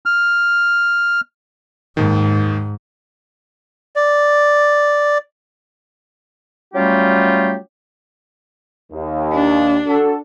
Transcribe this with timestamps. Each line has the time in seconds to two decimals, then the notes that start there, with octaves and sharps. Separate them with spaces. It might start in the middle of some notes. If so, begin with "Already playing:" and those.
0.06 F6
1.97 D#2 G#2 D#3
3.96 D5
6.74 F#3 G3 A3 C#4 F4 G4
8.92 D#2
9.33 D4
9.87 F#4 A4